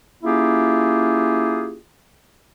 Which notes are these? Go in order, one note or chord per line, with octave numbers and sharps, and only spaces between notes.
A#3 C#4 E4 F4 G4 G#4